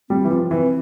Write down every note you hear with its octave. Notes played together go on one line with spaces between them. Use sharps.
G3 C4
E3
F3
E3 C4